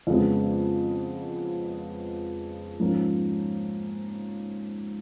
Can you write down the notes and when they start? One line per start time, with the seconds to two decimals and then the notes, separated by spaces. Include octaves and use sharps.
0.07 F2 C#3 G#3 B3
2.80 G#2 F3 A#3 C#4